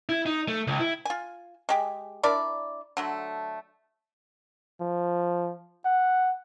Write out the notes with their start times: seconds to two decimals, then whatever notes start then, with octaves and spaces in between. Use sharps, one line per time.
0.09 E4
0.26 D#4
0.48 A3
0.67 C#2
0.80 E4
1.05 F4 G#5
1.69 G#3 G4 G#4
2.23 D4 E4 A#4 D5
2.97 D3 F#3 A3
4.80 F3
5.85 F#5